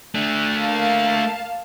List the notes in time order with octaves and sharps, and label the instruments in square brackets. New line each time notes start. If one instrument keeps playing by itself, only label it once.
[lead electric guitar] A3 D4
[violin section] A#3 F5 A5